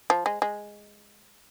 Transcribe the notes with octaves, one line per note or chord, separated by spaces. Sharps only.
F3
G#3
G#3